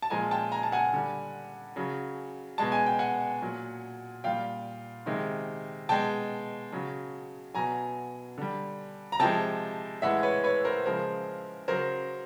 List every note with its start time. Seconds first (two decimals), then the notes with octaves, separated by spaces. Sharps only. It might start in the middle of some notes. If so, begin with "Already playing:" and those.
0.02 A5
0.10 A#2 F3 G#3 G#5 A#5
0.31 G5 A5
0.52 G#5 A#5
0.63 A5
0.72 F#5 G#5
0.94 D3 G3
1.76 C#3 F#3
2.58 B2 G#3 A5
2.72 G#5
2.86 G5
2.99 F#5 G#5
3.42 A#2 F#3
4.24 A#2 G3 F5 G5
5.06 C3 D#3 G#3
5.89 B2 G#3 G5 A5
6.72 C#3 F#3
7.54 B2 F#3 G#5 A#5
8.38 D3 G3
9.12 A#5
9.19 C3 F3 G#3 G5 A5
10.02 A2 E3 G#3 E5 F#5
10.23 B4 C#5
10.44 B4 C#5
10.64 A#4 C5
10.85 C#3 F3 G#3 A#4 C5
11.68 C#3 F#3 A#4 C5